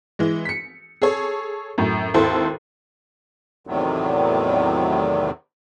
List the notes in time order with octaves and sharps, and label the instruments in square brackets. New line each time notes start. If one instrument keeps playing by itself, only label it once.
[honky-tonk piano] E3 G#3
B6 C#7
G#4 A4 C#5
F#2 A2
G#1 D#2 E4 A4 C5
[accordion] E2 A2 C3 D#3 F#3